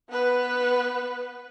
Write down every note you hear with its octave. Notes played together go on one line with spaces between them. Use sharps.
B3 B4